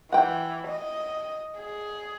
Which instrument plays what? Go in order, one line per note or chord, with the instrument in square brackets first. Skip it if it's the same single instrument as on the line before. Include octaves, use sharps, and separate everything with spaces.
[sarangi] E3 [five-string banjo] F#5 G5
[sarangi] D#5
G#4